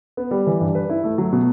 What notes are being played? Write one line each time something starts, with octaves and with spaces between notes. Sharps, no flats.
B3
G3
E3
G2
B4
E4
A3
F#3
B2